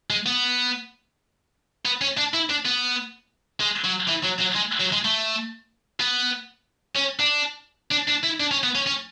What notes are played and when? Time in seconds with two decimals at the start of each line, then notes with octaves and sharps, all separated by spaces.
0.10 G#3
0.26 B3
1.85 B3
2.01 C#4
2.18 D4
2.34 E4
2.50 D4
2.65 B3
3.61 G#3
3.84 F#3
4.09 E3
4.24 F#3
4.40 F#3
4.56 G#3
4.80 F#3
4.92 G#3
5.05 A3
6.00 B3
6.96 C#4
7.20 D4
7.91 D4
8.08 D4
8.23 E4
8.40 D4
8.51 C#4
8.63 B3
8.75 C#4
8.87 C#4